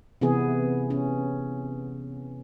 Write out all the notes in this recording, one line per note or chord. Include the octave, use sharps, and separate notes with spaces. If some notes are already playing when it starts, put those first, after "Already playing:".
C3 E3 B3 G#4
C#4